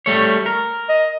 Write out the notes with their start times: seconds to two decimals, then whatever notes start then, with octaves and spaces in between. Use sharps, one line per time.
0.06 G3 A3 C#5
0.46 A#4
0.89 D#5